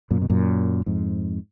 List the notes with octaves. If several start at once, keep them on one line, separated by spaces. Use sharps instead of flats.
F#2 A#2
B2
F#2 A#2
F2 G#2